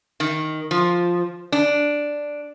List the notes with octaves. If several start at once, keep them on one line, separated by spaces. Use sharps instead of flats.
D#3
F3
D4